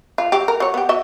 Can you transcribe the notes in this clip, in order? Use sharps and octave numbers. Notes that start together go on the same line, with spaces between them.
F4
F#3 G4
A#4
F#3 C#5
B3 G4
F#4 D#5 E5